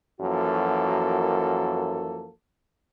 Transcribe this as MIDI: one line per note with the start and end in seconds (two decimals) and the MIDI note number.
0.21 2.30 42
0.21 2.30 52
0.21 2.30 53
0.21 2.30 58
0.21 2.30 66
0.21 2.30 69